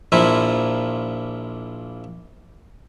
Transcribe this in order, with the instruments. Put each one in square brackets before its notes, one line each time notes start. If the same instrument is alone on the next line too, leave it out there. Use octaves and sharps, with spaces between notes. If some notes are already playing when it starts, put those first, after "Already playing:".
[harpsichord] A#1 A#2 F3 E4